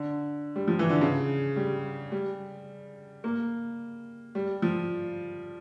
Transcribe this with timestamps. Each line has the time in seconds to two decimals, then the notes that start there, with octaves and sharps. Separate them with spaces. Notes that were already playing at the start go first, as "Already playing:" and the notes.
Already playing: D3
0.56 G3
0.68 F3
0.79 E3
0.89 D3
1.01 C#3
1.56 G3
2.12 G3
3.24 A#3
4.35 G3
4.62 F3